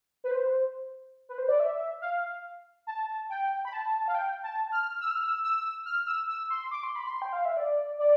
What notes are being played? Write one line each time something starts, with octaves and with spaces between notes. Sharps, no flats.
B4
C5
B4
C5
D5
E5
F5
A5
G5
B5
A5
F5
G5
A5
F6
E6
F6
E6
E6
F6
E6
E6
C6
D6
C6
B5
C6
G5
F5
E5
D5
D5